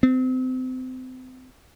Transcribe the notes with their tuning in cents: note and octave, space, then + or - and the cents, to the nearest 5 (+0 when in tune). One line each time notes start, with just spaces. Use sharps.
C4 -30